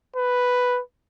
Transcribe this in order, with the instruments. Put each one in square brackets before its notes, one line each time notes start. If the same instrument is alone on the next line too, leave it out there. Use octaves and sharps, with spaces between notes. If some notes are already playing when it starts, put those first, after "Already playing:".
[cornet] B4